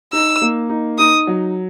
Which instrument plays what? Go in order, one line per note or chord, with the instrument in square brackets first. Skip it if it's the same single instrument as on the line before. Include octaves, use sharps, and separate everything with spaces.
[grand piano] D#4 [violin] E6
[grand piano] A#3
D#4
[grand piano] D#4 [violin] D#6
[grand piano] F#3